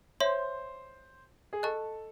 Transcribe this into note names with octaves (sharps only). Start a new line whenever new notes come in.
C5 C#5 E5 C6
G#4
A4 D#5 A5 C#6 F#6